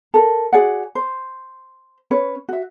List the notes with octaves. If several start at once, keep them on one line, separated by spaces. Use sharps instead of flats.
A4 A#4
F#4 G#4 D5 F#5
C5
C#4 B4 C#5
F#4 E5